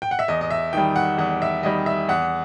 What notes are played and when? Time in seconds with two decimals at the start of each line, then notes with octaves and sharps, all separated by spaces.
0.02 G5
0.11 F#5
0.19 E5
0.28 E2 D#5
0.41 D#5
0.51 E5
0.73 D#3 G3 G5
0.96 F#5
1.18 E2 F#5
1.42 E5
1.63 D#3 G3 D#5
1.86 E5
2.08 E2 F#5